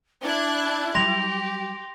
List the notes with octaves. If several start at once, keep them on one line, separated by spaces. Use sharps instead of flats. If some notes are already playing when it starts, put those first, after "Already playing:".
D4 E4 F#6 G#6
F#3 G3 G4 C6 A#6 F7